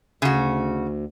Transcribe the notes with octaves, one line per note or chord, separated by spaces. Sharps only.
D2 C#3 F#4